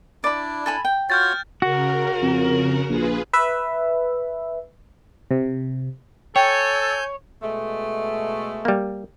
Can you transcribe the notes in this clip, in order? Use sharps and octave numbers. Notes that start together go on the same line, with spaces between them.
D4 E4 D5 B5
A4 G#5 B5
G5
F4 F#4 C#5 F6 G6 A6
C#3 F#4 A#4
F2
A#1 F4 G#4 B4
B4 E5
C3
A4 C#5 G5 G#5 G6
B2 G#3 A3
G3 A#3